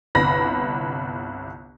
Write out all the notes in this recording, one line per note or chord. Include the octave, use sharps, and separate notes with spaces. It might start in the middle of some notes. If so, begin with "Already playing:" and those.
G1 C2 B5 A#6